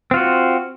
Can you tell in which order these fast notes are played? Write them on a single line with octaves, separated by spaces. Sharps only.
C4 F4 F#4